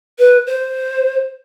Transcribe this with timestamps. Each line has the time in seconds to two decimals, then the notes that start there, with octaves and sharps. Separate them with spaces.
0.19 B4
0.47 C5